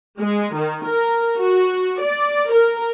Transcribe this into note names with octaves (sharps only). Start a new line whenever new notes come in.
G#3
D#3
A#4
F#4
D5
A#4